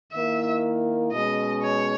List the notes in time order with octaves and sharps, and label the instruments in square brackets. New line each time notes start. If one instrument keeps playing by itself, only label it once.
[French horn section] D#3 A#3 E4 [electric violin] E5
[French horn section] B2 G#3 C#4 [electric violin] D#5
[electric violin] C#5